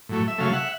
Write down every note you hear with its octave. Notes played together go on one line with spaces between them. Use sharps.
A2 F#3 A3
E5
C#3 F#3 A3 F5
E5 F#5